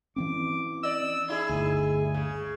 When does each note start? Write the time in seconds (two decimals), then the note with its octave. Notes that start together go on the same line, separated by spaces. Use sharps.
0.16 E3 C4 C#4 D6
0.83 D5 D#5 E6
1.28 D#4 E4 G#4
1.49 G1 D2 G#5
2.14 C#3